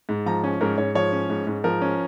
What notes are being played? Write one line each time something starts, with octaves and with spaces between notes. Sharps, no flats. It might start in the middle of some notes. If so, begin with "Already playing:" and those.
G#2
F3 A#5
C#4 G#5
G#2 A#4
G#2 C#5
F3 C#5
C#4
G#2
G#2
F3 A#4
C#4